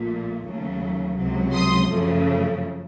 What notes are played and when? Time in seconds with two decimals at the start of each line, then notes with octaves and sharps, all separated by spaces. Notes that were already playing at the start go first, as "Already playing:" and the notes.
Already playing: A#1 A#2 A3
0.45 D#2 C#3 F#3 A3
1.16 C#2 C3 F#3
1.53 C6 D#6
1.89 F#2 C#3 F3 A3